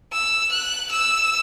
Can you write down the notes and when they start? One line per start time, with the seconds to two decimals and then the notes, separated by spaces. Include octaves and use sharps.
0.12 E6
0.52 F#6
0.91 E6